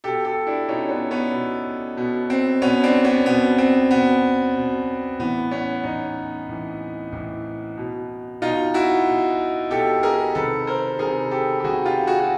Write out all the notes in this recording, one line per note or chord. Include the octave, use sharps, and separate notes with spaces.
B2 G4 A4
G4 A4
D4 E4
B2 C#4 D#4
B3 C#4
B3 C#4
B2
B2 B3
C4
B2 B3 C#4
C4 D4
B3 C#4
B2 B3
C4
B2 B3
B2
A2 E3 B3
B3 C#4
A2 E3 C#4 D#4
A2 E3
A2 E3
B2
B2 D#4 F4
E4 F#4
B2
B2 G4 A4
G#4 A#4
C3 D#3 A4 B4
A#4 C5
C3 D#3 G#4 A#4
G4 A4
G4
C3 D#3 F#4 G#4
F4 G4
F#4 G#4
F#4